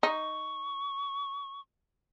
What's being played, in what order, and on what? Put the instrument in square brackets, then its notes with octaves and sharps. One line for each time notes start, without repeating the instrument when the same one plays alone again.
[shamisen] D#4 [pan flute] C#6